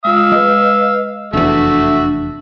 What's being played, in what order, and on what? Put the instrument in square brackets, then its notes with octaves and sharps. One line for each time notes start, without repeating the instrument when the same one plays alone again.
[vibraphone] G#3 F4 D#6 [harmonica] F5 E6
[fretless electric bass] G#3 [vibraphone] B4 D#5
[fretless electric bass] F1 E2 [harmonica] A3 F#4 E5 [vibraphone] D4